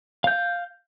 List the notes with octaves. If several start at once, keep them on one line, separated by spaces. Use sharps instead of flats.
F5 G6